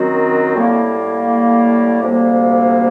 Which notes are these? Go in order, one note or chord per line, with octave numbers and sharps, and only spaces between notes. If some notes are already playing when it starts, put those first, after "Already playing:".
Already playing: F#2 D#3 F#3 C4 F#4
A2 G3 A#3
D2 C3 G3 A#3